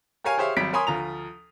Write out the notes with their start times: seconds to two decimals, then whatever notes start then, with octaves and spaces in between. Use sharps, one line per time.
0.24 G4 A#4 C#5 F5 G#5
0.38 G4 G#4 C5 C#5 E5 F5
0.57 G#1 F#3 G3 B6 D7
0.73 A#4 C#5 G#5 B5 C6 D#6
0.87 D2 F3 F4 A#5 F7